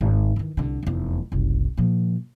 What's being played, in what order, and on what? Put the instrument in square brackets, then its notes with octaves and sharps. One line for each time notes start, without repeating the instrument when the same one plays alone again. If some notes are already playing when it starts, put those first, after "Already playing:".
[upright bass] G#1
D#3 E3
C2 D3
F1 E2
F#1 C2
A#2 F3